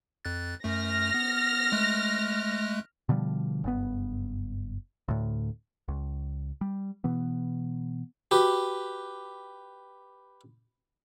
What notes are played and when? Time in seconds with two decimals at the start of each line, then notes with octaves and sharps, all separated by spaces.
0.25 F2 F#6 A6
0.64 F#2 A3 F6 A#6
1.14 B3
1.72 G#3 A3 F#6
3.09 B2 D3 F3 G3
3.64 F#1 G2 B3
5.08 D2 A2
5.88 C#2
6.61 G3
7.04 B2 E3 B3
8.31 F#4 G4 B4